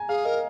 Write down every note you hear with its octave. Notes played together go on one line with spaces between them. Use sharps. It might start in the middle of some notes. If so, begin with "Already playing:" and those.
Already playing: G#5 A#5
G#4 F5
A#4 D#5